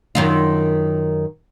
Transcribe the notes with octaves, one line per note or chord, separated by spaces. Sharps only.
F#2 D#3 F4